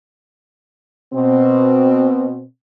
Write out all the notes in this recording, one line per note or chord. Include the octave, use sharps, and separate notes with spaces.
B2 C4